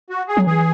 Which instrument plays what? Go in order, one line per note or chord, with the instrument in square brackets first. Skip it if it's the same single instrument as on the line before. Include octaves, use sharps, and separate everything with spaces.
[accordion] F#4
G#4
[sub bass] F#3
[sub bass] E3 [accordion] G#4